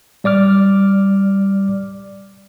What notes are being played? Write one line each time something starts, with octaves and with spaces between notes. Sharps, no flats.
G3 D5 D6 F6